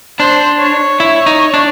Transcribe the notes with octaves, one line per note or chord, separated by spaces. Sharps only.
D4 C5
C#5
E4
D#4
D4